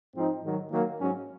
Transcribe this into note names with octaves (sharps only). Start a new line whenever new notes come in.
G#2 F3 C4 D#4
G#2 D#3 F#3
D#3 F#3 A#3
G#2 F#3 C#4